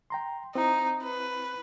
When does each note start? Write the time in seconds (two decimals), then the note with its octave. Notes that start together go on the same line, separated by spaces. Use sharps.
0.10 G5 A#5 C6
0.55 C4 D#4 E4
1.03 B4